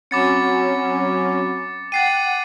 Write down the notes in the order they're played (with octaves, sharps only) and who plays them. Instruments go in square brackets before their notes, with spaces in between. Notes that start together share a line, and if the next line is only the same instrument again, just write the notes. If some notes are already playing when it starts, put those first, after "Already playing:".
[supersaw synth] F#3 C#4 [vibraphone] C4 F#5 B5 [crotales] D6 A6 C#7
[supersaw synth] F#5 [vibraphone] G5 [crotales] A6 C7 D#7